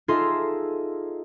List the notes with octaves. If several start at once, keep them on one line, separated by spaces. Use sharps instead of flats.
D#4 F4 G#4 A4 E5 C6